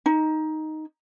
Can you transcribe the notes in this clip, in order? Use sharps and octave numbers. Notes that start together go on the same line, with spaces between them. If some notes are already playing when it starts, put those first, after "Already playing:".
D#4